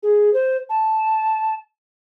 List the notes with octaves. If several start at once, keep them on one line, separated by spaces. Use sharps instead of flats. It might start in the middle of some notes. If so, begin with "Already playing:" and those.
G#4
C5
A5